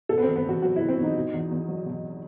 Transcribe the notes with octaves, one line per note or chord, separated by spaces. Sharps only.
B2 A4
B3
C4
E2
B3
E2 F#4
F#3 F#4
B2 E4
C4
E2 D#4
B2
E2
E2
F#3
B2